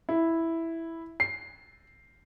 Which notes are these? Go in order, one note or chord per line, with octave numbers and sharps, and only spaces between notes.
E4
C7